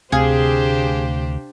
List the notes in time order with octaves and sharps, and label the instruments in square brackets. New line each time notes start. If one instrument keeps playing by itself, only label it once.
[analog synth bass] D2 [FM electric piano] C3 F5 [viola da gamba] D4 G4 C5 [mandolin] G#4